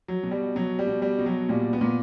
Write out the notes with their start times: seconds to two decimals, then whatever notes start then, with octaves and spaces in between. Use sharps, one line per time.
0.08 F#3
0.23 B2
0.31 G3
0.55 B2 F#3
0.79 G3
0.87 B2
1.02 G3
1.19 B2
1.26 F#3
1.49 A#2 G3
1.73 B3
1.81 A#2